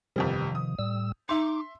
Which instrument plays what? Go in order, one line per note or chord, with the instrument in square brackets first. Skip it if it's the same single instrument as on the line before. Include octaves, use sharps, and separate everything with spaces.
[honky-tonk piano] G1 F2 G3 [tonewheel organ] C3 D#3 F3
[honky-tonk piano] D#6
[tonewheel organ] A2 G3 E6
[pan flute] D#4 [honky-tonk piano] E5 C6 [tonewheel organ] D6